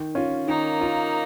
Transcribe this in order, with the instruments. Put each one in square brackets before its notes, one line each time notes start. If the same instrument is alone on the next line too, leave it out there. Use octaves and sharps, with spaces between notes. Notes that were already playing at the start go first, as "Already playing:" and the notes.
Already playing: [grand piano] D#3
C#4 F4
[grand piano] D#3 [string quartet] A#3 D#4
[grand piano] C#4 F4